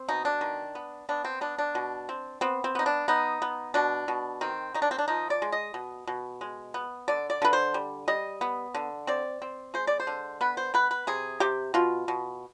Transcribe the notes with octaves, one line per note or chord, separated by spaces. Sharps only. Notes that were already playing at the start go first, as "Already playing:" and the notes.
Already playing: C4
B2 D#4
D4
D#3
B3
B3 D4
C4
B3 D4
D4
B2
C4
B3 C4
C4
B3 D#4
D4
B3 D#4
B3
B2 D4
B2
D#3 C4
D#3 D#4
D4
C4
D4
F3 D#4
D5
G#3
D#5
B2
B2
G#3
B3
D3 D5
D5
D3 B4
C5
G3
G3 D#5
B3
D3
C4 D5
C4
G#3 C5
D5
C5
D3
B3 B4
C5
B3 B4
B4
C3 G#4
C3 G4
B2 F4
B2